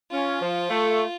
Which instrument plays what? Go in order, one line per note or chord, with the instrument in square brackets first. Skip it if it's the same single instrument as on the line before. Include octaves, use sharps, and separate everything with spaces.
[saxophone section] C#4 [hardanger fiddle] F4
[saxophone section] F3
A3